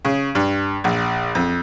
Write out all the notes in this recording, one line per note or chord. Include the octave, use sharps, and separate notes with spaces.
C#3
G2
A#1
F2